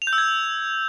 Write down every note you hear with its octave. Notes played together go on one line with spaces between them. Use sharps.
F7
G6
E6
G#6